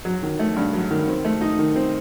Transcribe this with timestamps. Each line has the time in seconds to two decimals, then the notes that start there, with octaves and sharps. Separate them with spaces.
0.05 F#3
0.23 D#3
0.39 A3
0.56 G2
0.73 F#3
0.91 D#3
1.08 C4
1.25 A3
1.41 D#4
1.59 D#3
1.76 C4